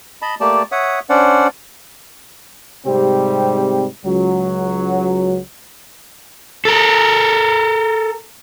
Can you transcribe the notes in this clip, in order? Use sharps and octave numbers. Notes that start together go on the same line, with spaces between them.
D#5 A5 B5
A3 A#3 G4 D5 A5
C#5 E5 F#5 D#6
C#4 D4 C5 D5 F#5
G#2 C3 G3 C4 G4
C#2 F#3
A4 A#4